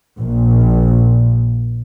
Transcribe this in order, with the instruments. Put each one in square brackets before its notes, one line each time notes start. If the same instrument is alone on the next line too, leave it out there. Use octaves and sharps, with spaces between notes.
[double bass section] A#1 A#2